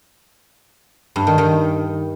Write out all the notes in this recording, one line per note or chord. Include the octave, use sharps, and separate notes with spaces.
G2
D#3
D#3